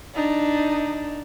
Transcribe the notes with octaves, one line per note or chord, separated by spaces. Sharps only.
D4 D#4